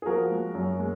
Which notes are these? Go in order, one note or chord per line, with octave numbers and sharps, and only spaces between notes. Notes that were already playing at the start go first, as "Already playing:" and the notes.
G#4
F3 F#4 A#4
G#3
F#2
G#3